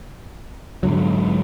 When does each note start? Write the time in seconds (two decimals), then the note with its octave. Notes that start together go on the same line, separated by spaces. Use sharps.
0.83 G#2 D3 F#3